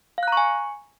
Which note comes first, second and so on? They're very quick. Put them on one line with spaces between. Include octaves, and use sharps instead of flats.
F5 F#6 A#5 C#6 G#5